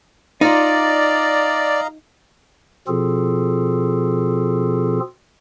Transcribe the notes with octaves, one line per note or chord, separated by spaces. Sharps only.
D#4 F4 D5 D#5 F5 A#5
B2 F3 C4 F4 G#4 A4